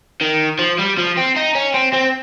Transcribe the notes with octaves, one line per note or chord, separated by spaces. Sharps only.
D#3
F3
G3
F3
C4
D#4
C#4
C4
C4